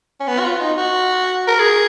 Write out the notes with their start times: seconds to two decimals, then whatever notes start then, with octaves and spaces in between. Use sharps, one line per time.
0.20 C#4
0.27 B3
0.39 F#4
0.45 F4
0.60 D#4
0.77 F#4
1.47 A#4
1.59 G#4